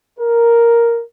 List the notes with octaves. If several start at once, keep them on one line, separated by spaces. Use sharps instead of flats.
A#4